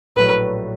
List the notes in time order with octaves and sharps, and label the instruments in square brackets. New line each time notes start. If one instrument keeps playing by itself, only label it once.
[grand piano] A#1 A2 F#3 A3 [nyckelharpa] B4